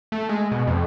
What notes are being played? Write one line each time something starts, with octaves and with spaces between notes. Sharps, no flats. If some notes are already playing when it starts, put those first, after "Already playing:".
A3
G#3
B2
F2